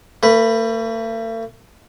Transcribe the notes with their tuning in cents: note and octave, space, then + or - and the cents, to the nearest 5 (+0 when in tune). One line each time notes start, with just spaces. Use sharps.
A3 +45 B4 +0